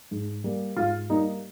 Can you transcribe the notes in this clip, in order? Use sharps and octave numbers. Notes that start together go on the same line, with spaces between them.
G#2
G3 A#3
G#2 F4
G3 A#3 D#4